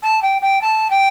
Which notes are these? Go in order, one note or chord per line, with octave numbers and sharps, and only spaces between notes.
A5
G5
G5
A5
G5